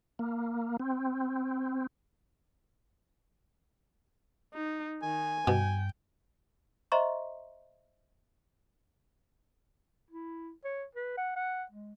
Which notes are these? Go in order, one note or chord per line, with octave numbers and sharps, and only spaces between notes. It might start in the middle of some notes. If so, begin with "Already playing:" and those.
A#3
C4
D#4
D#3 G#5
G2 B2 G5
C5 D#5 E5 A#5 C6 C#6
E4
C#5
B4
F#5
F#5
G#3